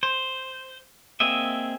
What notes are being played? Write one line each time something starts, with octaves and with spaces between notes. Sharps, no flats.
C5
A#3 C4 G#4 D#5 E5